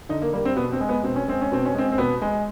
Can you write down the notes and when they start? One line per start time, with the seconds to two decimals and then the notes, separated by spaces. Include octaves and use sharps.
0.09 D3 D#4
0.22 A#3
0.33 G3 A#3
0.45 C4
0.56 B2 B3
0.72 C4
0.81 G#3
0.89 B3
1.03 B2 C4
1.16 C#4
1.28 G#3 C4
1.41 C#4
1.52 B2 C4
1.65 C#4
1.75 G#3 C4
1.92 C4
1.98 B2 B3
2.22 G#3